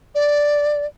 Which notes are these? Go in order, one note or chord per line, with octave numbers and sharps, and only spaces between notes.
D5